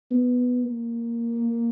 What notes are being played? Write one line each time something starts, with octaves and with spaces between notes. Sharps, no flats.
B3
A#3